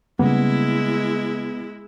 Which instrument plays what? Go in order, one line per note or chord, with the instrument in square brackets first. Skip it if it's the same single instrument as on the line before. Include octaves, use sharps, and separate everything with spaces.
[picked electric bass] C#3 G3 A#3 [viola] G#3 E4 [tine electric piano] B3